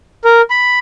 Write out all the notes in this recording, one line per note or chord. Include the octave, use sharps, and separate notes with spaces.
A#4
B5